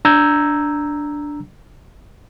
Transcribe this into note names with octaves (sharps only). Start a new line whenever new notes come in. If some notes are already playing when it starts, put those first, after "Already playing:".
D4 A#5 E6 G6 G#6